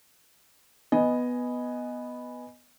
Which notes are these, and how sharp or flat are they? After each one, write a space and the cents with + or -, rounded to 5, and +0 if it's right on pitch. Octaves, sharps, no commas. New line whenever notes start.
B3 +0 D#5 +0 G#5 +0